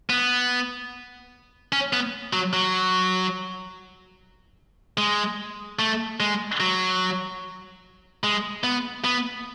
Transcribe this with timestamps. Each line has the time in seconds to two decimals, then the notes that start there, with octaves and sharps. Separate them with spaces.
0.10 B3
1.72 C#4
1.93 B3
2.33 F#3
2.53 F#3
4.98 G#3
5.79 A3
6.20 G#3
6.60 F#3
8.24 G#3
8.64 B3
9.04 B3